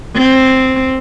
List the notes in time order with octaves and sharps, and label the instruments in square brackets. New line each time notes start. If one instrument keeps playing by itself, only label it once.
[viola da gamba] C4